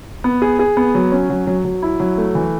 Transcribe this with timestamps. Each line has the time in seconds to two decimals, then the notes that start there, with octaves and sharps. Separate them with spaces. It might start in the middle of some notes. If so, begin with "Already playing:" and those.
0.24 B3
0.42 G#4
0.59 G#4
0.77 B3
0.95 F#3
1.12 C#4
1.30 F#3
1.47 F#3
1.65 F#3
1.82 E4
2.00 F#3
2.18 A3
2.35 E3